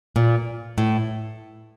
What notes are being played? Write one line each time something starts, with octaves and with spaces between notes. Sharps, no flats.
A#2
A2